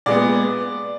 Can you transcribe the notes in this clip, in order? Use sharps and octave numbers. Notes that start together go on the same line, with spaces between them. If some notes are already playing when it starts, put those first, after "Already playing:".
A#2 G#3 B3 D5